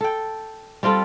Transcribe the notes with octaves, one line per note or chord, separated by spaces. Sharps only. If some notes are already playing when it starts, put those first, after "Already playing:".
A4 G5
G3 C4 F4 A4